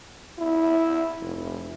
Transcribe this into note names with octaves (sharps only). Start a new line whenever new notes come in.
E4
F1